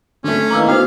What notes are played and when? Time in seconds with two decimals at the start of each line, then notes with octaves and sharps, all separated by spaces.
0.24 D3 A3 C#4
0.51 D#3 E3 A#3 A#5 D6 E6
0.68 B3 F#4 C5 F5